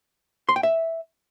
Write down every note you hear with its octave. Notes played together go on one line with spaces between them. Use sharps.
C6
G5
E5